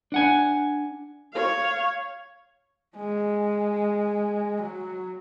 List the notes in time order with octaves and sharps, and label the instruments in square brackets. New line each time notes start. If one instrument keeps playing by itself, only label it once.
[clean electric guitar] D4 F#5 G#5
[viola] C#5 F5
[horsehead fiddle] G#3
F#3